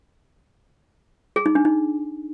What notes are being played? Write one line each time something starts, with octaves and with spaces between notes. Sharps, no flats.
G#4
D#4
D4
D#4